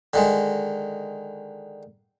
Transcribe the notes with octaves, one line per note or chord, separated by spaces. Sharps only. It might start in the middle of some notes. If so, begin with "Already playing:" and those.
D3 D#3 G#3